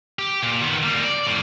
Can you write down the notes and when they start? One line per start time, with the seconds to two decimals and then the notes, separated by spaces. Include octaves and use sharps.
0.19 G4
0.43 A#2
0.62 D#3 B3
0.83 G3 A#3
1.04 D5
1.27 F2 A2